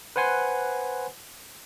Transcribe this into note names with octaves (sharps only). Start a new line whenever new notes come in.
B4 C5 F#5 G#5 C6